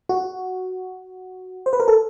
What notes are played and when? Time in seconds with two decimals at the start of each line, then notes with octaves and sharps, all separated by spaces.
0.09 F#4
1.66 C5
1.73 B4
1.80 A#4
1.88 A4